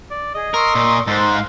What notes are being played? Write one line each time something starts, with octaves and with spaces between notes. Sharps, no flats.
D5
G#4 D#5
A#4 C6 C#6 E6
A#2
G#2 A4 C5 C6 F#6
F5